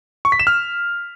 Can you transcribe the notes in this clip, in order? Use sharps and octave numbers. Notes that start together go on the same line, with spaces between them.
C#6
B6
E7
F6